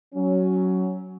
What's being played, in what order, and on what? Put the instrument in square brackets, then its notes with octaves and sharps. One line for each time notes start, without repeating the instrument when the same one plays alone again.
[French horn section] F#3 C#4